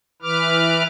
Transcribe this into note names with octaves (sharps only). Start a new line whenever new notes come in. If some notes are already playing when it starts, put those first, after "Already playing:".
E3 B4 D6 F6